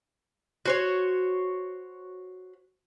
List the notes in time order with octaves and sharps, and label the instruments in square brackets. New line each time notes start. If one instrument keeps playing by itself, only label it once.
[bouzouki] F#4 C5 C#5